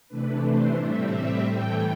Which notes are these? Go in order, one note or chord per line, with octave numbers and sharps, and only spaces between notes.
C3 E3 A3 D4 B4
C5
A2 G3 C4 E5
E5
A2 E3 A3 G5